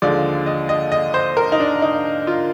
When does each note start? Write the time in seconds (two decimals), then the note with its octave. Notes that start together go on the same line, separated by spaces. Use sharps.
0.02 D#2 D3 F3 G#3 D5
0.46 D#5
0.69 D#5
0.92 D#5
1.14 C5
1.37 A#4
1.52 D#4
1.60 D4
1.82 D#4
2.27 F4